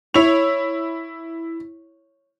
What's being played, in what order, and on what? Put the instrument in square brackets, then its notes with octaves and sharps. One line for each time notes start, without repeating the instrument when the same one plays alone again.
[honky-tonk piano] E4 F7 [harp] C#5